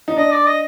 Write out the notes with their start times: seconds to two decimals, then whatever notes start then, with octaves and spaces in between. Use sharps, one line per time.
0.08 D#4
0.16 D4 D#5
0.31 D5
0.47 D#5